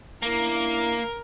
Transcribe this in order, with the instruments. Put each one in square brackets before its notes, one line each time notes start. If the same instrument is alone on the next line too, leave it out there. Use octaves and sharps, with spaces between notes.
[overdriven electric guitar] A#3 [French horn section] C#4 D4 E4 [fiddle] A#4